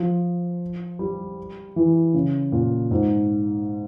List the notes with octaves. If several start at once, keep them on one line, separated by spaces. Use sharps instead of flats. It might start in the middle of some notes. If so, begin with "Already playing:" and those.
Already playing: F3
G3
E3
C#3
A#2
G#2